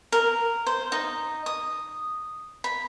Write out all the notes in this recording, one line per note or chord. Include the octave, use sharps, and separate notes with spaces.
A#4
C5
D#4
D#6
B5